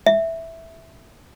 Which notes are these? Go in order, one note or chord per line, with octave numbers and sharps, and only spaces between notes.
E5